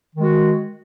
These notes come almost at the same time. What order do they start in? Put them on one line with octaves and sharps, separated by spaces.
D#3 G#3 F#4